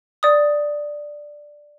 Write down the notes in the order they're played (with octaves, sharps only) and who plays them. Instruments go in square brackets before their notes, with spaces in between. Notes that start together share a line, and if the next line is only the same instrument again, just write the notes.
[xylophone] D5 D#6